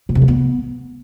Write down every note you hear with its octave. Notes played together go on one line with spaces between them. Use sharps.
A#2
C3
G3
B3